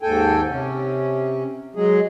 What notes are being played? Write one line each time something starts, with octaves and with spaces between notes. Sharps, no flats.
D#2 G#2 A4 G5 G#5
C3 C#4
F#3 G#3 G#4